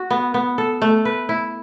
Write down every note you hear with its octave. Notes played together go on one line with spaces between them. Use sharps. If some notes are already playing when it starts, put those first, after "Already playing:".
Already playing: F#4
B3
B3
A4
A3
B4
E4